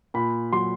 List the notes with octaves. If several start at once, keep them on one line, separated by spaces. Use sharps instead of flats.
A#2 B5
F#3 C6